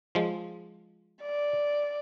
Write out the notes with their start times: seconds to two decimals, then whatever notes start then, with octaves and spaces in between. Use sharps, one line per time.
0.15 F3 G#3
1.23 D5